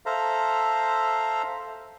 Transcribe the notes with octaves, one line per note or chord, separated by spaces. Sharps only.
A4 C5 E5 F5 A#5